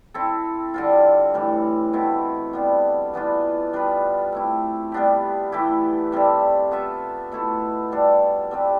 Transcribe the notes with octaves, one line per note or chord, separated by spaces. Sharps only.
C4 E4 A4
D3 G3 C4 F4
A2 E3 G3
B2 A3 C4 E4
G3 B3 D4
E3 B3 D4 F4
G3 D4 F4 B4
A3 C4 E4
G3 B3 D4 G4
E3 A3 E4 G4
C3 G3 D4 A4
B3 F4 A4 E5
B2 A3 E4 A4
G3 D4 A4
G3 C4 G4 B4